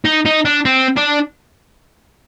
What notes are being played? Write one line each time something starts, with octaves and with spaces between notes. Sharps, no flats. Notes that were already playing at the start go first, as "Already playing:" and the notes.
D#4
D#4
D4
C4
D4